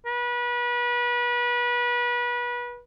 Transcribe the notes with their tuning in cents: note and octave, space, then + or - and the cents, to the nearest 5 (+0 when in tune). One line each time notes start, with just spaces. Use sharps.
B4 -30